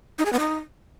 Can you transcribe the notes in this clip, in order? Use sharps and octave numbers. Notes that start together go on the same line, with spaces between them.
D#4
G#4
B3
D#4